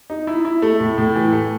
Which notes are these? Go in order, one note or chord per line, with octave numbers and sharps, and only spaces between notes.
D#4
E4
E4
A3
A2
A2
E3
A3